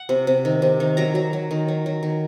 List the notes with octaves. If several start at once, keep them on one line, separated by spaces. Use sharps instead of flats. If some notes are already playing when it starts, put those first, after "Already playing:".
Already playing: F#5
C3
C3
D#3
C3
D#3
F#3 A#5
F#3
F#3
D#3
F#3
F#3
D#3